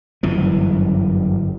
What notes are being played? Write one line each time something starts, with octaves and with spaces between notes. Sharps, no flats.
G1 F#2 E3